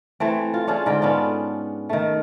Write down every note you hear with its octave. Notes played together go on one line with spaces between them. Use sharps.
E3 A3 C4
F4
C#4 D4 F4 G#4
G#2 D3 G5
B3 C#4 D4 F4
D#3 A3